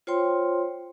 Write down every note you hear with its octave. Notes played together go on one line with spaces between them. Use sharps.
F4 C5 C#5 G5 C6